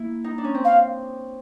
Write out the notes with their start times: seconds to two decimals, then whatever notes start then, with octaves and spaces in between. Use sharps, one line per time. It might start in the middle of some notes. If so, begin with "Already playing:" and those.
Already playing: A#3 E4
0.24 D#4
0.38 D4
0.44 C#4
0.55 C4
0.64 F5